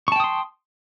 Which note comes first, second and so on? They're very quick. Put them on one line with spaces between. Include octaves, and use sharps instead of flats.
C#6 A5 G5 D#6 C6